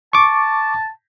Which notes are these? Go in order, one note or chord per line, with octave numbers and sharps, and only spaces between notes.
A5 C#6 D6